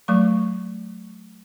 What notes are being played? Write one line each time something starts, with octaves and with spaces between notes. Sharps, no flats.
F#3 A3 C#6